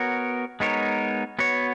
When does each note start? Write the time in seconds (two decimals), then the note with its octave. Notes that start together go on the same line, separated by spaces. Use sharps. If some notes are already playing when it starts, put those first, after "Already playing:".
Already playing: B3 F#4 A#4 C#5
0.60 G#3 B3 D#4 A#4 C#5
1.39 B3 F#4 C#5